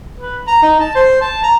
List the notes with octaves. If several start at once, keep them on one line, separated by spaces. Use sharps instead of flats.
B4
A#5
D#4
A5
C5
A5
A#5